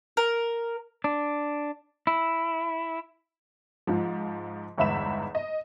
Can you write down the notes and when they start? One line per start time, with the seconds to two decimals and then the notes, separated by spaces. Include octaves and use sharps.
0.17 A#4
1.04 D4
2.07 E4
3.87 G#2 F3
4.78 G1 E2 G#2 E5 B5 E7
5.35 D#5